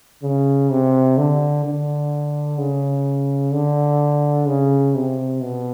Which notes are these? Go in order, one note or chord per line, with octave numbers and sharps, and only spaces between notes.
C#3
C3
D3
D3
C#3
D3
C#3
C3
B2